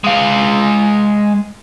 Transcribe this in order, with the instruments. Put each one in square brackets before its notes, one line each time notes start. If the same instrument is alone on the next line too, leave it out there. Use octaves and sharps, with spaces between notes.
[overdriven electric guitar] G#3 F5